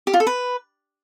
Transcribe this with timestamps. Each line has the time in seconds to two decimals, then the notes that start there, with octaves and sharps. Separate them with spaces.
0.07 G4
0.14 F4
0.20 A4
0.27 B4